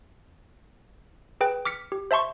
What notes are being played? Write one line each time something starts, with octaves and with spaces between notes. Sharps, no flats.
G#4 B4 G5
D6 F6 B6 C#7
G4
C5 E5 A5 C6 C#6